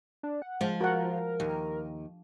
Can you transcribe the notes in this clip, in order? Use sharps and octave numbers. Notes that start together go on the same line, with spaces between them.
D4
F#5
F3 G#3
F#4 A#4 F#5
D#2